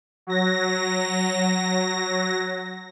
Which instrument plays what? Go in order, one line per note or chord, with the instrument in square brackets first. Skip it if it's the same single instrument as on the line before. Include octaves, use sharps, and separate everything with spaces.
[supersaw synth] F#3 A#6